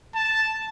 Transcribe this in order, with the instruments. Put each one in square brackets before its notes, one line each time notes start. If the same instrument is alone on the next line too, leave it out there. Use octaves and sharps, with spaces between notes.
[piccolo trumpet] A5